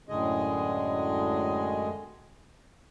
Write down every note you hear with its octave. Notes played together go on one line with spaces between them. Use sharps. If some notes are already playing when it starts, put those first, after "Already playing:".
F#2 A2 D3 G#3 G#4 D#5